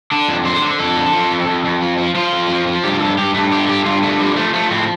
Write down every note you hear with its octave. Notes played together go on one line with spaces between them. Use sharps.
D3 D4
F2
D3 C5
D3
F2 A4
D3
F3
F2
F2
F2
F3
F3
F3 F4
F2
F3
F3
G2 G4
G2 A4
G2 G4
G2 A3
D3 G4
G2 G4
G2 F4
D3 A3
F3 G3
F3 A3
F3 A3
A2 C4